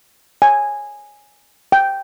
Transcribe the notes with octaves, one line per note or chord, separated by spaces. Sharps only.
G#5
G5